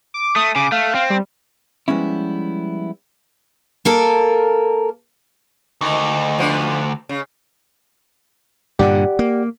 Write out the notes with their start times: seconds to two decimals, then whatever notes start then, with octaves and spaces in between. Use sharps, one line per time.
0.14 D6
0.36 A3 D#6
0.56 C#3 D6
0.72 A3 F5
0.95 C4
1.10 G3
1.88 F3 G3 G#3 B3 C#4 E4
3.85 A#3 A4 A#4
5.81 D2 D#3
6.38 F3 B3 D4
7.09 C#3
8.79 G2 A#2 D3 G4 D5 F#5
9.19 A#3